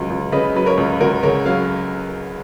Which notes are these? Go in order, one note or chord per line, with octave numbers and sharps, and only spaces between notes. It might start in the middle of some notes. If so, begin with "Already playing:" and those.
Already playing: C#2 F#3
C#2
C#3 B4 D#5
F#3 B4
A#4 C#5
C#2
C#2 F#4 A#4
C#3 A#4 C#5
F#3 C#5 F5